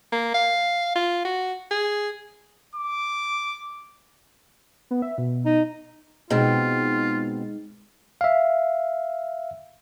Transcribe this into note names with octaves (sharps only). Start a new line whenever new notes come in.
A#3
F5
F4
F#4
G#4
D6
B3
E5
B2
D#4
B2 G#3 C4 D#4 F4 G5
E5 F5